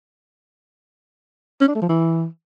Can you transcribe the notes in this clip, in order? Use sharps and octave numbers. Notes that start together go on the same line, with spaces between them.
C#4
D4
A3
F3
E3